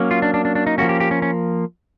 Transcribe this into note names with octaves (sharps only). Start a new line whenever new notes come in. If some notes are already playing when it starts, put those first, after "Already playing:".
Already playing: F#3 A#3 C#4
F4
D4
D4
D4
D4
D#4
F3 A#3 C#4 F#4
G4
G4
C#4
C#4